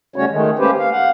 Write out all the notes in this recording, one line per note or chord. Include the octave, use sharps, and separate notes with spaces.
C#3 G3 A3 C#4 F#4 C#5
D#3 G#3 A3
A3 A#3 C#4 G4 B4 C5
F5
F5 F#5